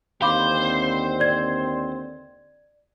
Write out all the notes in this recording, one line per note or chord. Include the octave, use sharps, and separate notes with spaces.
D#2 D3 C4 C5 F5 B5 D6
D5 G#6